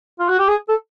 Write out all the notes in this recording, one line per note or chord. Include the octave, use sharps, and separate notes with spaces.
F4
F#4
G4
G#4
A4